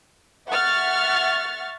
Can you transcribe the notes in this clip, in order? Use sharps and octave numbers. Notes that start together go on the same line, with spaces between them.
E5 F#5 C#6 F6 A6